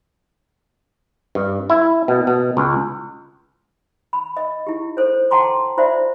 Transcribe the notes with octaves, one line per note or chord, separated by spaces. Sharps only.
G2
E4
B2
B2
C#2
B5
D#5
E4 G4
A4 C5 C#5
F#5 G5 A5 A#5 C6 D6
F4 C5 D5 E5 F#5